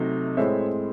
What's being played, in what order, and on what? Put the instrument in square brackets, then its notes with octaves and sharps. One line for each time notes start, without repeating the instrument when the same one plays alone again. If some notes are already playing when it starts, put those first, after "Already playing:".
Already playing: [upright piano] C3 F#3 A3 D#4
A2 G#3 C4 C#5 E5